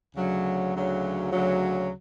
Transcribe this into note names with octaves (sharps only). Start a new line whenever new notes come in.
D2 C#3 F#3
D2 C#3 F#3
D2 C#3 F#3